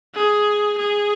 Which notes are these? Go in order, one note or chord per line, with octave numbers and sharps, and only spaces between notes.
G#4
G#4